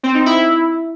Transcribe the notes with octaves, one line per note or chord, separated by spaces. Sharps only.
C4
D#4
E4